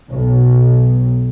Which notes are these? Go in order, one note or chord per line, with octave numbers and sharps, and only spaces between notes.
B1